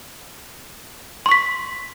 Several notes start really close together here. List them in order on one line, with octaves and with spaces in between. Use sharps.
C6 C#6 B6